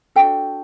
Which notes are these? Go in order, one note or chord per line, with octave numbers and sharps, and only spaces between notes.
D4 F#4 A4 G5